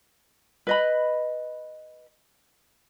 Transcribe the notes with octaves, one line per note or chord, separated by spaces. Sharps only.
B4 D#5 B5